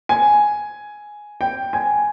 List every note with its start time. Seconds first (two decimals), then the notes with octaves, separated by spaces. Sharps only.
0.09 G#5
1.41 G5
1.73 G#5